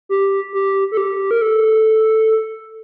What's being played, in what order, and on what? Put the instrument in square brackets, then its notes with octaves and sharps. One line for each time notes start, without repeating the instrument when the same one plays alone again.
[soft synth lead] G4
G4
A4
G4
A#4
A4